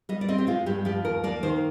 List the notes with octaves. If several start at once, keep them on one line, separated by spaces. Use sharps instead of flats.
G3 D#5
D5
C4 D#5
G4
G#3 F4
G2 G4
F3 G4
D#2 A#4
A#3 D5
D#3 C5